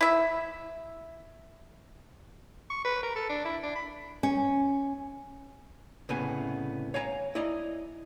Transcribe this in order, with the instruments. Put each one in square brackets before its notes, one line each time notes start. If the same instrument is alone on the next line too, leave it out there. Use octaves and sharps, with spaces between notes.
[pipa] E4 E5
[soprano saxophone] C#6
B4
A#4
A4
D4
E4
D4
B5
[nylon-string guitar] C#4
[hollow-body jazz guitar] C2 A2 C#3 B3 G#5
C#5 F5 G#5 A#5
E4 D5 D#5 A#5